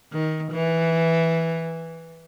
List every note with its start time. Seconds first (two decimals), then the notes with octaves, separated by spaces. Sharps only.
0.13 D#3
0.52 E3